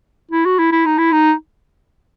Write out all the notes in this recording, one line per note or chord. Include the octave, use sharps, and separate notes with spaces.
E4
F#4
E4
E4
D#4
E4
D#4